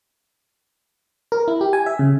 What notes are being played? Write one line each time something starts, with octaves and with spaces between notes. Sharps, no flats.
A#4
E4
G4
G#5
E5
C#3